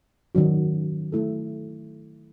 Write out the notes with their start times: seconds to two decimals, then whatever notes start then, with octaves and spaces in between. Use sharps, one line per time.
0.35 D#3 F#3 C#4 F#4
1.12 A3 E4 A4